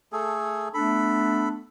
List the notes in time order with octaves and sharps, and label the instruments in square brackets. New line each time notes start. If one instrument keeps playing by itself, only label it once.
[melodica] A3 G#4 A4
[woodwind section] A3 B3 D4 [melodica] A4 B5